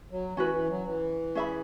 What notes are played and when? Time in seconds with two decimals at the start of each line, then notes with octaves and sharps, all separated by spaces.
0.11 F#3
0.36 E3 C#4 F#4 B4
0.53 E3
0.69 F#3
0.86 E3
1.35 C#4 G#4 E5 B5